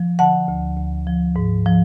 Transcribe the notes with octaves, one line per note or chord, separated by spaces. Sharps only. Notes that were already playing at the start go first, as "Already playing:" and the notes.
Already playing: F3
D3 F#5 A5
D2
D2
F3
G#2
F3